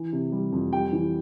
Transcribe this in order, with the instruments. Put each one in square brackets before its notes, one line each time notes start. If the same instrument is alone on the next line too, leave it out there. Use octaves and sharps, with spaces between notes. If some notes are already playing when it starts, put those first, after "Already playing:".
Already playing: [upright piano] E3
C3
G3
F2
G3 G5
E3